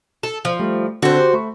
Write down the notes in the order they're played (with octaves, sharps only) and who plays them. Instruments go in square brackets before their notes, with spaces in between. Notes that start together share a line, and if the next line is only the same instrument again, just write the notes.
[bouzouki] A4
F3
[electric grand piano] G3 A3
[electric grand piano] D3 C4 [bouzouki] F#4 C5
[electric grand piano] G4
A3 B5 C#6